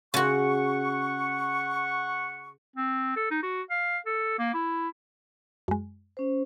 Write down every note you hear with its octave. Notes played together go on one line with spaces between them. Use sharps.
C#3 F#4 F#5 C#6
C4
A4
D#4
F#4
F5
A4
A#3
E4
F#2 G#3
C#4 C5